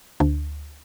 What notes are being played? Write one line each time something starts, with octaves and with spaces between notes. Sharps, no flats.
D2